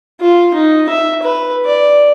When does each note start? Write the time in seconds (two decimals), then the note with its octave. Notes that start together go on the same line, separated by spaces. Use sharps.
0.21 F4
0.55 D#4
0.89 E5
1.23 B4
1.66 D5